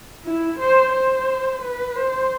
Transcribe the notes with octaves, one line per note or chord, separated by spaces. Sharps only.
E4
C5
C5
B4
C5